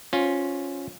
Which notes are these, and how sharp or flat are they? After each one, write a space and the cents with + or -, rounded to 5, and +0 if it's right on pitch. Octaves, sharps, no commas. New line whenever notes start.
C#4 +0 F4 +15 C5 +0